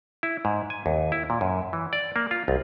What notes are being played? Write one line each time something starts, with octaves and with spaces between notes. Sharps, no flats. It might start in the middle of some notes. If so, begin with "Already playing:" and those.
E4
G#2
G#5
D#2
E4
A#2
F#2
E3
D5
A#3
F4
C2